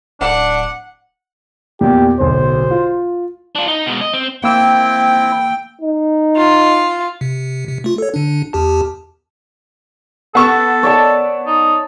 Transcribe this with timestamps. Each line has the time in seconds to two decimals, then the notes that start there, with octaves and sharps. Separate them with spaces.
0.21 D1 D4 F#5
1.81 E2 A#2 G4
2.21 D1 B1 C5
2.71 F4
3.55 D4 F4
3.68 D#4
3.86 B2 G#3
4.01 D#5
4.13 C4
4.44 A#3 C4 E4 G5 E6
5.81 D#4
6.37 F4
7.21 C3
7.68 C3
7.84 A3 F4
7.98 A4 C#5
8.14 D3 D4
8.53 E2 G4 A5
10.35 B3 A4 C#6 E7
10.83 C#5 D5 A5
11.47 D#4